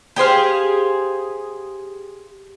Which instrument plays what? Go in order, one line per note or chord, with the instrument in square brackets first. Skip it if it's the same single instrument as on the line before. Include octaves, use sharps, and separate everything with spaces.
[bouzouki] G4 G#4 C5 F5